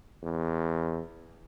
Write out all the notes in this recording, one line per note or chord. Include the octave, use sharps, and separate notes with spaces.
E2